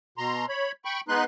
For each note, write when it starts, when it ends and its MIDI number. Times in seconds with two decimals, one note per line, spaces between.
0.18 0.46 47
0.18 0.46 82
0.18 0.46 84
0.49 0.72 73
0.49 0.72 83
0.85 1.01 79
0.85 1.01 83
0.85 1.01 85
1.09 1.24 56
1.09 1.24 59
1.09 1.24 63
1.09 1.24 71
1.09 1.24 84
1.09 1.24 90